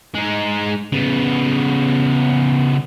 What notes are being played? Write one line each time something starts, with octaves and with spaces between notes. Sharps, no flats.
G#3 D#4
C#3 B3